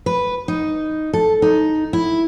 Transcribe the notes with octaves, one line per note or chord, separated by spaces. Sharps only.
B4
D#4
A4
D#4
E4